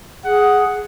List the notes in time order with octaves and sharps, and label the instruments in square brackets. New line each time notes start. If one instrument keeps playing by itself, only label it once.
[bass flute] G#4 [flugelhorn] F#5